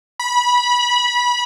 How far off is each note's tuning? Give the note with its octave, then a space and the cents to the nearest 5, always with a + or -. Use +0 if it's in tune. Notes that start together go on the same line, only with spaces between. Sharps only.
B5 -30